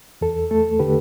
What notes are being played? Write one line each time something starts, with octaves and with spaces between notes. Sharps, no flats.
E2 A4
A3 A4
D3 G4 B4